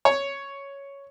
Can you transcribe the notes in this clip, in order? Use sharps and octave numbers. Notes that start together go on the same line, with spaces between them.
C#5